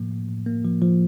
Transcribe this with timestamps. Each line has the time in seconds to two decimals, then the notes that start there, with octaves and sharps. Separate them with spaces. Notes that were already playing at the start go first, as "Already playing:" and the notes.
Already playing: A2 F3 A#3
0.11 A2
0.29 A2
0.47 A#3
0.65 F3
0.82 F3